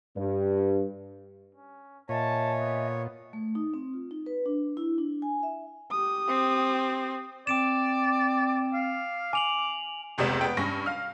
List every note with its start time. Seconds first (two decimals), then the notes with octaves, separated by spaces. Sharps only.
0.17 G2
1.55 C#4
2.09 A#2 C#5 D#5 E5 G#5 A5
2.60 B3
3.33 A3
3.55 D#4
3.74 C4
3.94 F4
4.11 D#4
4.26 B4
4.46 D4
4.77 E4
4.98 D4
5.22 G#5
5.43 E5
5.92 G4 D#6
6.29 C4
7.47 C4 D5 D6 D7 E7
8.73 F5
9.33 G#5 D6 F7 F#7
10.18 F1 C#2 C3 B3 D5 E7
10.41 B3 G5
10.57 G2 C#4 C#6 A#6
10.86 F5 F6